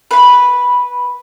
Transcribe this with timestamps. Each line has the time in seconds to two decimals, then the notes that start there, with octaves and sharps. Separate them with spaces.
0.11 B4 B5